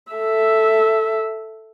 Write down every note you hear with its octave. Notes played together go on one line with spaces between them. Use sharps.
A4 E5